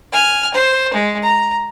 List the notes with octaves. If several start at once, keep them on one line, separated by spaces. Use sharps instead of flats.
G#5 F6
C5
G#3
A#5